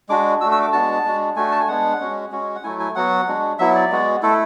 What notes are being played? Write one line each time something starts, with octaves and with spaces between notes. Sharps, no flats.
G#3 D4 F#4 D6
A3 D4 F#4 E6
E6
D6
G#3 B3 D4 F#4 A5
G#3 D4 F#4
A3 D4 F#4 G#5
A5
G#5
G#3 B3 D4 F#5
G#3 C#4 F#4
G#3 C#4 F#4
F#5
F#3 A3 E4 G#5
G#5
F#3 B3 F#4 F#5
G#3 D4 F#4
F#3 B3 E4 E5
D5
G#3 B3 F#4
A3 E4 A4